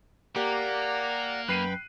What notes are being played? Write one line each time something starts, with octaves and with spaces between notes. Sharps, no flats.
A#3 G4 A#4 D5 F#5 A#5
F#2 B4 G5 B5 F#6 C7 D#7